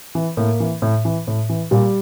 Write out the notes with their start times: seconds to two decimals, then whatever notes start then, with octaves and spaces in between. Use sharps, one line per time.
0.15 E3
0.37 A2 A#3
0.60 E3
0.82 A2
1.05 E3
1.27 A2
1.49 E3
1.71 A#2 G3